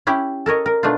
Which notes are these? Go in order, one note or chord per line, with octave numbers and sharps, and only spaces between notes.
C#4 E4 G4
A4 A#4 C#5 D#5
A#4
B2 A3 D4 D#4 F4